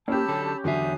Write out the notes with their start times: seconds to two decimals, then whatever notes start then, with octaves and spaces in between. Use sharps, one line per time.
0.08 A#3 C#4 G4 A5 B5 E6
0.29 D3 F#3 A4
0.64 E2 D3 F#3 E5 G#5 D#6 C7